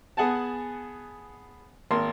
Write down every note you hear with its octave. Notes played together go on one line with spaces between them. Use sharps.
B3 G#4 F#5 G#5 A5
G#1 A#3 C6